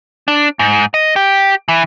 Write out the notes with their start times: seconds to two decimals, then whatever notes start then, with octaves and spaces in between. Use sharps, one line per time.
0.28 D4
0.59 G#2
0.94 D#5
1.16 G4
1.69 E3